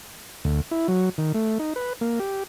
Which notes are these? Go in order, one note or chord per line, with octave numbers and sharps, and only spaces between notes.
D2
E4
F#3
D#3
A3
D#4
B4
A#3
G4